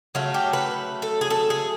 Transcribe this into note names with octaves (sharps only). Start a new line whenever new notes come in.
C#3 F#3 A3 F4
G4
B4
A4
G#4
A4
G#4